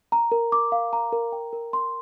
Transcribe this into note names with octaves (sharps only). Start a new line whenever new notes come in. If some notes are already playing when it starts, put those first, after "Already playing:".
A#5
A#4
D6
F5
A#5
A#4
G5
A#4
C6